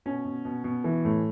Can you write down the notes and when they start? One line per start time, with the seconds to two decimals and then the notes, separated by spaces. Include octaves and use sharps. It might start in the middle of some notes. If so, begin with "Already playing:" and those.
0.06 B2 C#4
0.25 B2
0.45 B2
0.64 B2
0.84 E3
1.05 A2